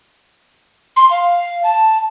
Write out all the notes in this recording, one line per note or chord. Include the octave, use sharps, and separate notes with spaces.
C6
F5
A5